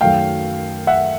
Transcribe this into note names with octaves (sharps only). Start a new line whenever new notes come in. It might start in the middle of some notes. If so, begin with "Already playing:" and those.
F#2 D#3 F#3 A3 F5 G5
E5 F#5